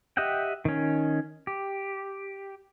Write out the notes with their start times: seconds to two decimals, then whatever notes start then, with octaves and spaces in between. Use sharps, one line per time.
0.17 G4 D#5 E5 F#5 G5
0.65 D#3 C#4
1.47 G4